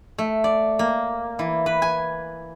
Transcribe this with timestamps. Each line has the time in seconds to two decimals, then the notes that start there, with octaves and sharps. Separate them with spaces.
0.18 A3
0.44 D5
0.79 A#3
1.39 E3
1.66 B4
1.82 G#5